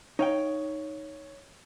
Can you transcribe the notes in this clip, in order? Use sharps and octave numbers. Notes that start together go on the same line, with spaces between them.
D#4 C#5 F5 G5